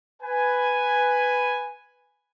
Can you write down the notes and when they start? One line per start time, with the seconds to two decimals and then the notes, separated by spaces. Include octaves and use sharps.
0.22 B4 G#5